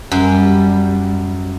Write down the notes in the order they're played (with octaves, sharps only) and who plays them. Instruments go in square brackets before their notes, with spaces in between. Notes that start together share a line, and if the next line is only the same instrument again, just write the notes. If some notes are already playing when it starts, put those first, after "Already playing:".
[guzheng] F#2 [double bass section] G3